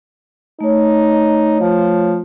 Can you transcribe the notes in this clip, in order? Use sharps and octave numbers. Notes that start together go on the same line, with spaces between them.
A3 D#4 C#5
F3